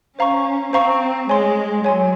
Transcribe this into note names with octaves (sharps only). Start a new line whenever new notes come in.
C#4 C5 F5 A#5 C#6
C4 C5 F5 A#5 C#6
G#3 C#5 G#5 C6
F#3 C#5 G#5 C6